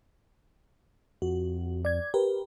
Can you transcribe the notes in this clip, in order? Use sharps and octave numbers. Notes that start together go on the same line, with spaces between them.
F2 F#4
D5 G#6
G4 A#4 B4